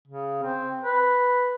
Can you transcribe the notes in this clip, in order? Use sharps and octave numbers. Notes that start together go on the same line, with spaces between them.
C#3
C4
B4